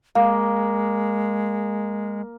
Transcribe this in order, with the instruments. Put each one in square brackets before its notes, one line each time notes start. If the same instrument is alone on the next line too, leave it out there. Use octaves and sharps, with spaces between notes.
[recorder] G#3 [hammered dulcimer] A#3 [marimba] F5